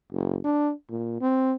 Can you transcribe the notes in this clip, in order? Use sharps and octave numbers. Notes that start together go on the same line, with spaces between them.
F#1
D4
A#2
C4